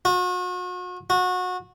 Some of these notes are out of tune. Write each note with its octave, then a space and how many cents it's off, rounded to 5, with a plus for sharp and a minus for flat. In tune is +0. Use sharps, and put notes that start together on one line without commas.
F#4 -40
F#4 -25